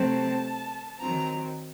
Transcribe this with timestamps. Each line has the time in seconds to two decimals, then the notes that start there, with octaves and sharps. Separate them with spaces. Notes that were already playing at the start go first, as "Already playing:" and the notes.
Already playing: C3 F#3 A3 C4 A5
1.00 D#3 F#3 C4 A#5